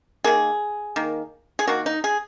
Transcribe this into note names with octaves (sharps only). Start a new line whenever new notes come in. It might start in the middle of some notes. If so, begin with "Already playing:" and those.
D#3 A#3 G#4
D#3 A#3
G#4
D#3 A#3 F#4
D#4
G#4